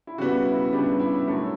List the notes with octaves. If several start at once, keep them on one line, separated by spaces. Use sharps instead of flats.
E4
C#3 G3 B3 F#4
E4
C#3 G3 B3 D4
E4
F#2 D3 F#3 A3